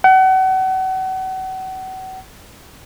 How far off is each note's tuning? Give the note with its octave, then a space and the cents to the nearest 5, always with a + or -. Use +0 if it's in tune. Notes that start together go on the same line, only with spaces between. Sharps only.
F#5 +35